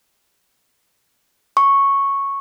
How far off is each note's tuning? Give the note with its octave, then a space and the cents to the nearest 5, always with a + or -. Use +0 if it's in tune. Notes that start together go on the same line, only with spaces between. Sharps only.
C#6 -5